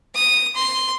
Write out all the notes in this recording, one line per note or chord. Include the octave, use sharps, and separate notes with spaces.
D#6
C6